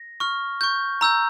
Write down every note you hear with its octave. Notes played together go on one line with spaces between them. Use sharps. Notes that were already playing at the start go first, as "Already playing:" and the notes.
Already playing: A#6
C#6 F6
C#6 G6
A#5 E6 G6